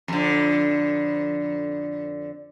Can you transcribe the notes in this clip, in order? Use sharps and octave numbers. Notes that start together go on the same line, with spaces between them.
F2 D3